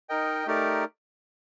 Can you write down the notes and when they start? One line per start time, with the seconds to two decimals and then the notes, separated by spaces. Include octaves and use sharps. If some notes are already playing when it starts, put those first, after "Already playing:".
0.09 D#4 A#4 D#5 G5
0.46 A3 D#4 G4 A#4 D5